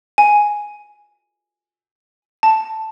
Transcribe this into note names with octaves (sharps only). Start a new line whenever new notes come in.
G#5
A5